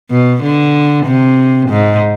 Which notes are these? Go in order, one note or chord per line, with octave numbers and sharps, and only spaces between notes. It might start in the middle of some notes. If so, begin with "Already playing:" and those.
B2
D3
C3
G#2